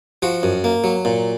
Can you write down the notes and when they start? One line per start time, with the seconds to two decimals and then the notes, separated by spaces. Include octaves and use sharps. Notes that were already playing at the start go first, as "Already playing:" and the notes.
0.22 F3 F#4
0.43 F#2
0.64 A#3
0.84 F#3
1.05 A#2